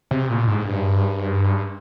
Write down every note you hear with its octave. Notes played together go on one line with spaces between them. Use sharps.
C3
A#2
G#2
G2